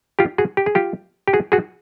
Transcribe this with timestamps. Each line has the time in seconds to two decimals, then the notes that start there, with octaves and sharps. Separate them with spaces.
0.19 F4 G4
0.38 F#4 G#4
0.57 G4
0.66 G#4
0.75 F4 G4
1.28 G4
1.33 F#4 G#4
1.52 F#4 G#4